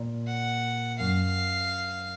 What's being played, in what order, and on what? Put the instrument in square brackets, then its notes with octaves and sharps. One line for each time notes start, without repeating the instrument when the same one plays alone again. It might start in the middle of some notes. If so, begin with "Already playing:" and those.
Already playing: [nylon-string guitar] A#2
[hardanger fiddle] F#5
[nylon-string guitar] F#2 [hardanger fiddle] F5